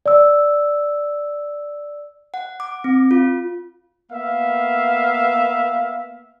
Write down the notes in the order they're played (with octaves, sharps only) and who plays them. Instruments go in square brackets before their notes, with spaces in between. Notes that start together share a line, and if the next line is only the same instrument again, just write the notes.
[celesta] D5 E6
[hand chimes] F#5
D6
C4
F4
[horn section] A#3 B3 E5 F5